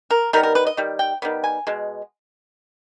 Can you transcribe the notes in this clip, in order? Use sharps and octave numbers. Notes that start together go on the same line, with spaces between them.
A#4
D#3 G3 B3 A#4
A#4
B4
D#5
D#3 G3
G5
D#3 G3 B3
G#5
B2 G#3